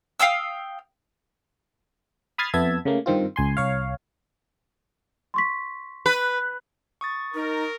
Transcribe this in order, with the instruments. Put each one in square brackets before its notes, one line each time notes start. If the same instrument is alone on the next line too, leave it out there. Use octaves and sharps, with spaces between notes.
[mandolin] F5 G5 D#6 E6
[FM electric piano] B5 D#6 F6 G#6 A6 C7
F2 B3 E5 A5 G#6
C#3 A3 A#3
G2 D#3 C4 F4
C#2 G#5 C6
C2 C#5 F5
[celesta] C6 C#6 B6
[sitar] B4
[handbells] C#6 D#6 A6
[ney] D#4 [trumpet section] A#4